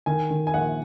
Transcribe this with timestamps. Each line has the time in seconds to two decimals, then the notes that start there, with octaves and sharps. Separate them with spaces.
0.06 D#3 G#5
0.31 D#3
0.47 G#5
0.54 A#1 F#5